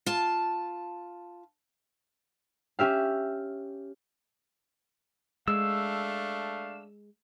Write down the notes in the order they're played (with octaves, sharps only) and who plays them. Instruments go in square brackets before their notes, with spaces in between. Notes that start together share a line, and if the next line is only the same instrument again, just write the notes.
[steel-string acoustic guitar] F4 A5
[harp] C#4 G4 E5 F5
[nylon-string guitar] G#3 [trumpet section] A3 D4 F5 [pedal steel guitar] E6